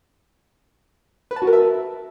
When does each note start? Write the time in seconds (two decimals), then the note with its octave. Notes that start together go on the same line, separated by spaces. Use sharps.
1.31 B4
1.36 A5
1.42 F#4
1.47 A#4
1.53 E5